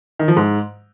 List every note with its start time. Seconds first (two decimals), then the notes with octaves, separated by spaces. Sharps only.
0.19 D#3
0.28 F3
0.37 G#2